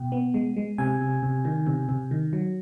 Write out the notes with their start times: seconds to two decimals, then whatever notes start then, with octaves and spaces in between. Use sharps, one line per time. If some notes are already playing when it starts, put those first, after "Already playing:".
Already playing: B2 G5
0.12 B3
0.34 G#3
0.57 G#3
0.78 C3 G#5
1.01 C3
1.23 C3
1.45 D#3
1.67 C3
1.89 C3
2.11 D#3
2.33 F#3